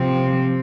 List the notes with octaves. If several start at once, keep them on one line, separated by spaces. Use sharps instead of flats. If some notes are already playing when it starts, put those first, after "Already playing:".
Already playing: C3 F3 C4